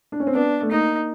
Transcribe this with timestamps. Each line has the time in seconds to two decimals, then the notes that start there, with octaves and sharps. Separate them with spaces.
0.12 D4
0.20 C#4
0.27 C4
0.34 B3 D4
0.62 A3
0.71 A#3 D#4